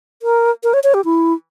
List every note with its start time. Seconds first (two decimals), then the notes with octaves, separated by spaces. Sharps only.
0.22 A#4
0.63 A#4
0.74 C#5
0.84 C#5
0.94 G4
1.05 E4